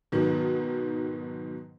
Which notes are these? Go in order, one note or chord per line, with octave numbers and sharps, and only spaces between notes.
G#2 B2 D#3 F#3